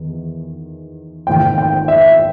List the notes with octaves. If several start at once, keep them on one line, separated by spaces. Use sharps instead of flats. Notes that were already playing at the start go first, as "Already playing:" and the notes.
Already playing: E2 D#3
G#1 G#2 D#3 G5
G5
E5